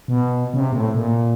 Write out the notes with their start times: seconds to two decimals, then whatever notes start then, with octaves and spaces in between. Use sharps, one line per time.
0.08 B2
0.54 C#3
0.60 C3
0.73 A#2
0.77 A2
0.95 A#2